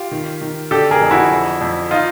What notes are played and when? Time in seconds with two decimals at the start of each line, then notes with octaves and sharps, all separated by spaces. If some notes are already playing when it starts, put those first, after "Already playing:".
Already playing: F4 G4
0.11 D#3
0.41 D#3
0.71 D3 G4 A4
0.91 G#4 A#4
1.01 F2
1.11 E4 F#4
1.31 F2
1.61 F2
1.91 D#4 F4